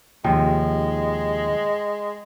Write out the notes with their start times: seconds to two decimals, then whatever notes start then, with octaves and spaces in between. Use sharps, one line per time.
0.25 D#2 C3 F3 G#3 G5